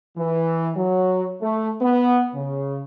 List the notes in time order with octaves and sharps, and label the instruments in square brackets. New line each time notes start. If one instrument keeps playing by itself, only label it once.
[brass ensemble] E3
F#3
A3
B3
C#3